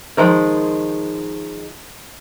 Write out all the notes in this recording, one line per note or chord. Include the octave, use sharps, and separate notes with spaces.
D#3 F3 G#3